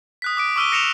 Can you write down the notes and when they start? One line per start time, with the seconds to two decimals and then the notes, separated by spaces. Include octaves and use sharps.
0.22 D#6 F#6 B6
0.37 D6 D#6 D7
0.56 C#6 D6 E6 F6 D#7 G7
0.72 A#6 C#7 E7 F7